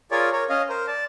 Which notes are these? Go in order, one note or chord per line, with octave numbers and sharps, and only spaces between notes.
F4 G#4 A#4 C#5 D5
A#4 C#5
C#4 D#5 F5
A#4 C5
D5 A5